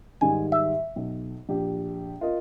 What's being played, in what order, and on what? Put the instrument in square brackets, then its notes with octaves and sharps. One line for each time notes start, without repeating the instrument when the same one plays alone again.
[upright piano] G#2 D#3 G3 [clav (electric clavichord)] G#5
[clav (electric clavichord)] E5
[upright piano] B1
A#1 G4
F4 A#4 D#5